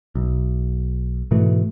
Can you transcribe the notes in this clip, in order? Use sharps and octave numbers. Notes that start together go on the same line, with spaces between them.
B1
G#2 B2 E3 A3